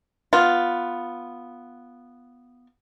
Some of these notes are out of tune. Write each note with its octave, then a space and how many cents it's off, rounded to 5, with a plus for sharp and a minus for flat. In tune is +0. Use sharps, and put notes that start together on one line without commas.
B3 +0 F4 +0